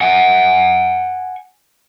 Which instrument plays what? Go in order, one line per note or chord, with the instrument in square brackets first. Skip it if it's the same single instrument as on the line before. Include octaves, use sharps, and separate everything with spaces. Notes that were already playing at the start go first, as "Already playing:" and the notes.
[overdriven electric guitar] F#5 G#5